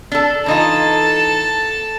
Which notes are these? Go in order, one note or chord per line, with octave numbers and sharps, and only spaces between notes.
D4 A4
E3 D#4 F4 A4 A5